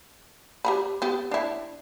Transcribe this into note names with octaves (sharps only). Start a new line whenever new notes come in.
G4 A#5 B5
B3 G4
D4 E4